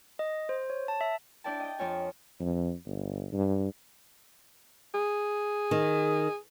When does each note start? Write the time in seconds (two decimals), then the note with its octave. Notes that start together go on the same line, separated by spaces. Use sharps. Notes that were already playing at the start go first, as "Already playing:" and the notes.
0.19 D#5
0.49 C5
0.70 C#5
0.88 A5
1.01 E5
1.44 D4 E4 D5 G5 A5
1.60 D#5 G5
1.79 F2 F4 C#5 G#5
2.40 F2
2.86 G1
3.33 G2
4.94 G#4
5.71 D#3